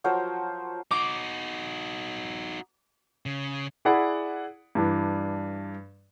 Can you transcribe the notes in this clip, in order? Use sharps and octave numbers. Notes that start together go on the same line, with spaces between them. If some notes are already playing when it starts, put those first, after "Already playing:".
F3 F#3 A#4 C5
D#4 F#4 D6
C#3
E4 G#4 D5 F#5 B5
G2 E3 D4